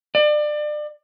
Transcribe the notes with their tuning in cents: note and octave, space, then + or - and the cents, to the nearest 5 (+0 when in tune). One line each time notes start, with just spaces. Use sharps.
D5 +30